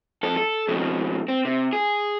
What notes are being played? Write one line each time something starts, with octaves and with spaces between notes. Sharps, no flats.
F2 A4
A4
F2 B2
C4
C3
G#4